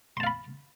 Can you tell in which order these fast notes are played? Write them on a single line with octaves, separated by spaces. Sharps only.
C6 A5 F5 B5